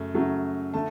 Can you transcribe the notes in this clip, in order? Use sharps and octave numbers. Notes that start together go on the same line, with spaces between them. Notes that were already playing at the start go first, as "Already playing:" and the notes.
Already playing: F#2 C#3 A3
F#2 C#3 F#3 A3
D3 A3 A5